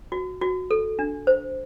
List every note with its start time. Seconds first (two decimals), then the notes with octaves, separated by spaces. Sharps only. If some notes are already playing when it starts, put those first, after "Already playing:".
0.12 F#4
0.41 F#4
0.71 A4
0.99 D4
1.27 C5